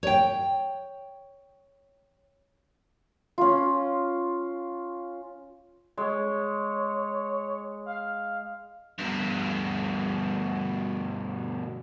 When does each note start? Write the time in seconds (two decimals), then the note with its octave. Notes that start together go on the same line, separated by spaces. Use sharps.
0.03 C#5 G5
3.38 C#4 F4
5.97 G#3 C#5
7.86 F5
8.98 G2 B2